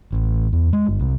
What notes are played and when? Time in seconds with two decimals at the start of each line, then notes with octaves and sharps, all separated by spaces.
0.13 A1
0.53 E2
0.73 G#3
0.87 G1
0.99 C2